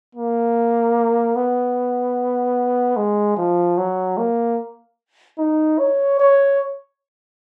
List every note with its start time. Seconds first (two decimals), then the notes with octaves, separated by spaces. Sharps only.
0.15 A#3
1.36 B3
2.97 G#3
3.37 F3
3.78 F#3
4.18 A#3
5.38 D#4
5.79 C#5
6.19 C#5